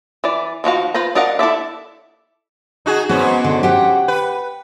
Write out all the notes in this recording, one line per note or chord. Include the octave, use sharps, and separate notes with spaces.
E3 D5
D#3 F3 F#4 F5
F4 B4 C5 A#5
D4 A#4 D#5 F5 F#5
E4 A4 D5 E5
D#4 F#4 G#4
G#2 B3 C#4 F#4
D3
G4 F#5 G5
B4